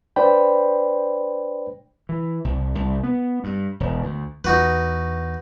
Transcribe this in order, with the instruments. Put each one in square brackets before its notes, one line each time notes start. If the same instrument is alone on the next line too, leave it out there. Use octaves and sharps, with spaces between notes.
[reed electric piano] D4 B4 C5 D5 G5 B5
[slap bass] E3
C2
C2
B3
G2
E1
D2
[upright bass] E2 [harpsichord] D#4 F#4 B4